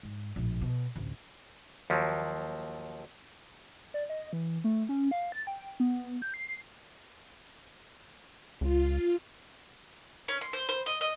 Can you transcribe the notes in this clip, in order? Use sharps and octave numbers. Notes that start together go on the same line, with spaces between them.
G#2
A#1 A2
B2
A1 D2
D#2 F3 F#3
D5
D#5
E3
A3
C#4
F5
A6
G5
B3
G6
C7
C#2 F4
C#4
C6
C5
C5
D#5
D#5